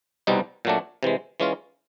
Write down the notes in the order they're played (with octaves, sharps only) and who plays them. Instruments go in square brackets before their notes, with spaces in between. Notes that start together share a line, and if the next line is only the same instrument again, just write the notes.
[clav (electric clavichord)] C2 B2 G3 C4 D#4
A#2 F#3 A3 D4
C3 E3 G#3
E3 G#3 C#4 F4